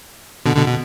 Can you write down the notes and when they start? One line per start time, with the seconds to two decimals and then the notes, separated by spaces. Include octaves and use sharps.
0.46 B2 D3
0.56 B2 D3
0.68 B2